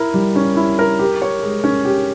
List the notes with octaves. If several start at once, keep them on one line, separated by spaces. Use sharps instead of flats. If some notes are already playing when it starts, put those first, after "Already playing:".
Already playing: E4 A#4
G3
C#4
E4
A#4
G4
C#5
G#3
C#4
G4